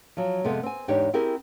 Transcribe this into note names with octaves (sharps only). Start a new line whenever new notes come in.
F3 F#3
F2 C3 G#3 B3 A4
C4 G#5
E2 G#2 D4 D#4 G4 C#5
C4 E4 G4 G#4 A#4